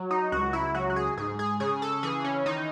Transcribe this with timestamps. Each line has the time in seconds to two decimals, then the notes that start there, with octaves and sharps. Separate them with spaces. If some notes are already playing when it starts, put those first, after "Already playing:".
Already playing: F#3
0.11 D#4
0.32 C#2 F#4
0.53 E4
0.75 F#3 F#4
0.90 F#4
0.96 G#4
1.17 G#2 G#4
1.39 G#4
1.60 C#3 G#4
1.82 A4
2.03 E3 G#4
2.24 C#4
2.46 D#3 D#4